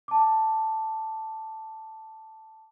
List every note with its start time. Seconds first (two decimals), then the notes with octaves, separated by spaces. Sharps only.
0.08 A5 D6